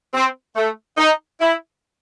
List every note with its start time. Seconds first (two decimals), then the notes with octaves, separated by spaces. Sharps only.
0.14 C4
0.56 A3
0.98 D#4
1.41 E4